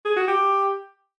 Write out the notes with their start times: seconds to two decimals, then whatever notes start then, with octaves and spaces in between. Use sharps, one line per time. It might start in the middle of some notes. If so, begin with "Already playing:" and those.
0.05 G#4
0.16 F#4
0.28 G4